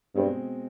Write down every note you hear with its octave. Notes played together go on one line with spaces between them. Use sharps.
G2 B2 G#3 C4